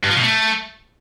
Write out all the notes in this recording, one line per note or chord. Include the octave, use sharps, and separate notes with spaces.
G2
F3
B2
A3